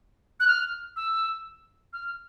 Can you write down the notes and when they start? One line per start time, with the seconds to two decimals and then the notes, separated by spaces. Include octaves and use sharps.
0.40 F#6
0.47 F6
0.96 E6
1.93 F6